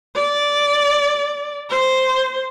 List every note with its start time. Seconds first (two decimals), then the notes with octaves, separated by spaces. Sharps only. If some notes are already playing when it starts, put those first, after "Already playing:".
0.15 D5
1.70 C5